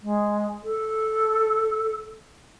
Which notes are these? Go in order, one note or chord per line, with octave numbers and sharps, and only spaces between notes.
G#3
A4